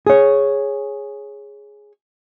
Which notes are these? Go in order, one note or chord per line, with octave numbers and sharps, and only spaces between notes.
G#4 C#5